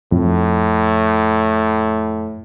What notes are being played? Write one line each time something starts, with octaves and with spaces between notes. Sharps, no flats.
F2 A2